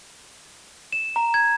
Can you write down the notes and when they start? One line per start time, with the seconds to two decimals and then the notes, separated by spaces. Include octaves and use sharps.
0.93 E7
1.16 A#5
1.34 G#6